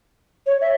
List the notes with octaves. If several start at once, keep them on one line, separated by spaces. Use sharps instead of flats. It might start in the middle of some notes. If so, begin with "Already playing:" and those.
C#5
E5